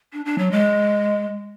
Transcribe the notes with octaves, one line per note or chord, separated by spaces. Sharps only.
D4
D4
F#3
G#3